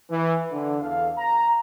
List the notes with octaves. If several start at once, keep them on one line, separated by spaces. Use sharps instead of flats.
E3
D3
E2 A4 F5
A#5